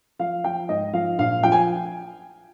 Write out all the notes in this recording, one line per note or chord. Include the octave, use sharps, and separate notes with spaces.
F3 F5
F3 G5
G#2 D#5
F3 F5
A#1 F5
F3 G5
G#5